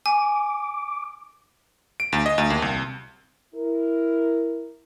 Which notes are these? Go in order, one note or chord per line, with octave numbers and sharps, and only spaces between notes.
G#5 D6
D7
D2
D#5
D2
D#2
C2
E4 A#4